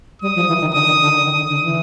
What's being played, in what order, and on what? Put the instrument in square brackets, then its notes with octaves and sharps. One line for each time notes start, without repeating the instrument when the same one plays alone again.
[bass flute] G3 [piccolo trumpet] D#6
[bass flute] F3
E3
D#3
[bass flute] D3 [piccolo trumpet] D#6
[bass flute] D#3
D3
D#3
[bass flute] D#3 [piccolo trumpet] D#6
[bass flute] D3
D3
E3